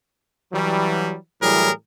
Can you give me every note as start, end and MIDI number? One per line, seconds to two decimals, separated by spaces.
0.53 1.16 52
0.53 1.16 54
0.53 1.16 55
1.42 1.70 45
1.42 1.70 52
1.42 1.70 54
1.42 1.70 55
1.42 1.70 68
1.42 1.70 70